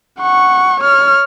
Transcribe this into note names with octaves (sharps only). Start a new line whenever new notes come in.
F#5 C#6
C#5 F6